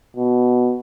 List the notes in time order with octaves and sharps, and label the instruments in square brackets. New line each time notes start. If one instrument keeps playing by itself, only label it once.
[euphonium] B2